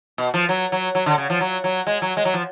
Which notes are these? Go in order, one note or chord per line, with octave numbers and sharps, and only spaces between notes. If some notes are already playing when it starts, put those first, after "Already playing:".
B2
F3
F#3
F#3
F#3
D3
C#3
F3
F#3
F#3
G#3
F#3
G#3
F#3
F3